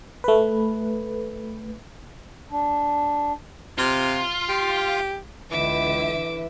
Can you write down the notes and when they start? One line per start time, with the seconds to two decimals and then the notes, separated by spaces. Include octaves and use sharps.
0.24 A3 B4
2.51 D4
3.78 C3 F4
4.49 G4
5.51 C#2 D3 E3 E5 D6